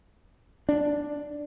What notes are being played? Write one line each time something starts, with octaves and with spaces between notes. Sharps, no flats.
D4